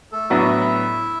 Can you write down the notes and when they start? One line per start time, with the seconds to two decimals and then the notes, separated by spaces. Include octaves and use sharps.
0.12 A3 A4
0.30 A2 F#3 B3 D4 E4 F#4 E5